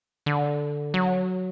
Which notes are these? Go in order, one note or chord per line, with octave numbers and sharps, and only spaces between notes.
D3
F#3